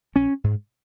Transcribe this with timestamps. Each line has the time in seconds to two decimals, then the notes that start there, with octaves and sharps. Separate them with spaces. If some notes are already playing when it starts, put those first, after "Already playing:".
0.15 A#1 C#4
0.44 G#2